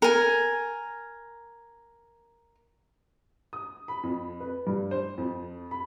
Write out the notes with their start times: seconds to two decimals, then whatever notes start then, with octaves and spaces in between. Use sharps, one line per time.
0.02 A#4 G#5
3.53 D#6
3.88 B5
4.03 F2
4.40 B4
4.67 G2
4.91 C5
5.18 F2
5.71 B5